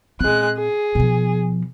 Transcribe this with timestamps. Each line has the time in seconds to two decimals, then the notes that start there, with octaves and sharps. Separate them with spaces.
0.21 A#2 G#3 C4 F#6
0.58 G#4
0.95 B2 F3